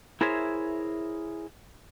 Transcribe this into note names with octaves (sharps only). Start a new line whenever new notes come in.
E4 G#4 A#4 C5 C#5 E5